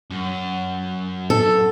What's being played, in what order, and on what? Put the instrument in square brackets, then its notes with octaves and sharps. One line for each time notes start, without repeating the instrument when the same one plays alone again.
[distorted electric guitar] F#2
[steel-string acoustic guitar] A4